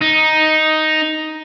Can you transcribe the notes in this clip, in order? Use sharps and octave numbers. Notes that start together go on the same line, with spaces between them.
D#4